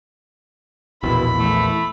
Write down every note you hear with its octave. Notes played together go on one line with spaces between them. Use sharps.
A#1 E2 B2 E4 B5
E3 A3